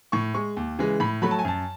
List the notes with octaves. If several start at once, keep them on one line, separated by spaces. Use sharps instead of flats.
A2 C#6
G#3 C#6
D#2
C#3 E3 G#3
A2 B5
F#3 A3 B5
A5
G#5
F#2 A5